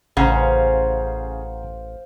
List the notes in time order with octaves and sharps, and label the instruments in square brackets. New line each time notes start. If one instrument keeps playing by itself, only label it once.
[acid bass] A1 [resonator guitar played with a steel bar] C#3 [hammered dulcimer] C5 F5 [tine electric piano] F#5 G#5 A#5